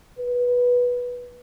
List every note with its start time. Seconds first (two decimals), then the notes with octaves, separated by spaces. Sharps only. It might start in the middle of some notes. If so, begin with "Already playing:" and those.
0.19 B4